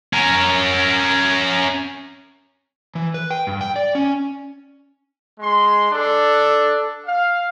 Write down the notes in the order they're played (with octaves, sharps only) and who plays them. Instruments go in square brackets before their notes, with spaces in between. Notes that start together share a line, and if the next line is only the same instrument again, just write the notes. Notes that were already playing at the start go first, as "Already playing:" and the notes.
[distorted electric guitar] C#4 A#4
[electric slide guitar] E3
B4
G5
G2
G5
D5
C#4
[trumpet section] G#3 C6
D4 A4
F5